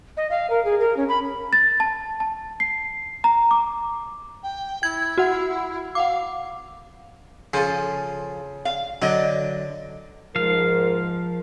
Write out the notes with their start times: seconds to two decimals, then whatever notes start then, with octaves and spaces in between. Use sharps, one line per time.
0.17 D#5
0.30 F5
0.50 A#4
0.65 G#4
0.80 A#4
0.97 C#4
1.09 B5
1.53 A6
1.80 A5
2.20 A5
2.60 C7
3.24 A#5
3.51 D6
4.43 G5
4.83 E4 G#6
5.18 F#4 F#5
5.95 F5 F#5 D6
7.54 C#3 F3 A4
8.65 F5
9.02 D3 F#3 D#5
10.36 G#2 F3 A#4 F5